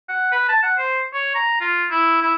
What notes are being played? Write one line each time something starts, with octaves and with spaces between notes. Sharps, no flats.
F#5
B4
A5
F#5
C5
C#5
A#5
F4
E4
E4